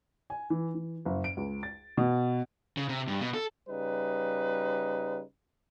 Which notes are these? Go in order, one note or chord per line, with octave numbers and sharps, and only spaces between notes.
G#5
E3
E3
F#1
D7
C#2
A6
B2
C#3
C3
G2
B2
A4
C#3 G3 D#4 B4